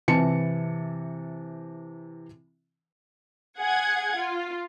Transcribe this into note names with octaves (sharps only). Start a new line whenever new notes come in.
C3 E3 A5 C#7
G#4 F#5 G#6
F4